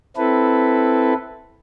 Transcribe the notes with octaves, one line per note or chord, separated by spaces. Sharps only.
C4 E4 A4 B4